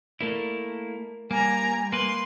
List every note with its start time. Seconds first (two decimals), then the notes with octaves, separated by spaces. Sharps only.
0.21 A3 A#3 E4 A#4 D5
1.31 G3 A#3 G#5 A#5
1.92 A#3 B4 C6